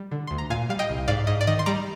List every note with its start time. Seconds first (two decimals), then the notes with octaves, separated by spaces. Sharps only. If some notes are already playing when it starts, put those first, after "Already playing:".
Already playing: G3
0.11 D3
0.27 D2 C6
0.38 A#5
0.50 A#2 F5 G#5
0.69 G3 F5
0.79 D#5 G5
0.90 C2
1.08 G#2 D5 F5
1.27 G#2 D#5
1.41 D5
1.47 D#3 D#5
1.59 C6
1.66 G3 A#5 D6